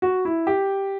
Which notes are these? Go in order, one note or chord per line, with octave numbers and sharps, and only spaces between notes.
F#4
E4
G4